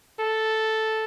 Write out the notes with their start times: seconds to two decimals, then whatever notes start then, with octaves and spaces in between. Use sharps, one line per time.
0.20 A4